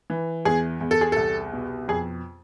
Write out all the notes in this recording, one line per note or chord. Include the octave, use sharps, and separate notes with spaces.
E3
E2 G#4
E2
A4
G#4
C2 A4
B2
F2 G#4